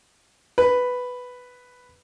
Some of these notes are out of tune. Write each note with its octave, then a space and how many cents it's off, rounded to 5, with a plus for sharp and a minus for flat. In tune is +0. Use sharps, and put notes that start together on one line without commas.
B4 +5